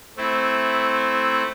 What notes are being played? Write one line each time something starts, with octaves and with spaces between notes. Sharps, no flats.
A3 C4 E4